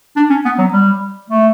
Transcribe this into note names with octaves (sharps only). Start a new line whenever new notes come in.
D4
C#4
B3
F#3
G3
A3